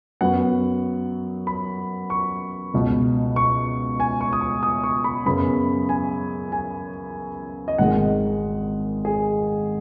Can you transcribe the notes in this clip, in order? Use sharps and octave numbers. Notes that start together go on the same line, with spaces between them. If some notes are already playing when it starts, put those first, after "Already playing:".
F#2 F#3 B3 F#5
B5
C#6
C#2 B2 B3
C#6
G#5
C#6
D#6
C#6
D#6
C#6
B5
F#2 C#3 B3 B5
G#5
G#5
D#5
G#1 G#2 D#3 G#3 F#5
G#4